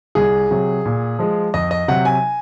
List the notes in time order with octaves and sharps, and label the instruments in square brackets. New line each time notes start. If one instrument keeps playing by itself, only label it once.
[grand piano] C2 G#4
C3 F#3
A#2
F3 G#3
F2 D#5
D#5
C3 F#3 F#5
G#5